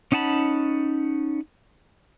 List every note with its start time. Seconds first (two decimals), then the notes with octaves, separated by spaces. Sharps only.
0.12 C#4 D#4 F#5 A5 B5